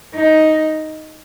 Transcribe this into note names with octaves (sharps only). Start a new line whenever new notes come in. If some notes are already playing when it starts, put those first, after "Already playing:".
D#4